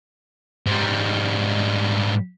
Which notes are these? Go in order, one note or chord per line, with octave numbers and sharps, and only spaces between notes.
G#2 G3